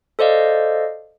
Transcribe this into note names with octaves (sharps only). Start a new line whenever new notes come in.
A4 C5 D5 D#5 F5